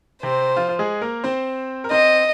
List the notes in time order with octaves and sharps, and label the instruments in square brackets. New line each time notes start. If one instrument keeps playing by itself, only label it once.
[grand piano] C3 C4 [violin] C5
[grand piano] F3 F4
F4
G#3 G#4
A#3 A#4
C4 C5
A#4
[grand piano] C4 C5 [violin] D#5